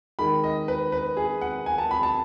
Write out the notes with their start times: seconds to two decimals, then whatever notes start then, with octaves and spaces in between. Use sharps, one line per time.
0.19 D#3 G#3 B5
0.44 D#5
0.68 B4
0.92 B4
1.17 G#4
1.41 F#5
1.66 G#5
1.78 A5
1.91 B5
2.03 A5